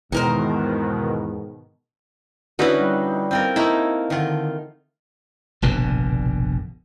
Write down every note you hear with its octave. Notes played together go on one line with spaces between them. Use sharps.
E2 G#2 B2 D#3 D#4 A#4 C5
D3 C#4 D#4 E4 F#4 B4
G3
C4 F4 A#4
A3 A#3 D#4 E4
D3 D#3 F4
F1 A#1 B2 D3